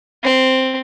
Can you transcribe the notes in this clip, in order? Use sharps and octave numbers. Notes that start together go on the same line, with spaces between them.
C4